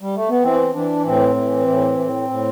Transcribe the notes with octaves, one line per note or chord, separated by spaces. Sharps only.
G3
A3
B3
E3 C4
E3 D4
A2 C4
E3
A2
A2
A2